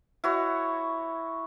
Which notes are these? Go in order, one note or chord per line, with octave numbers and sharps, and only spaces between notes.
E4 F#4 C#5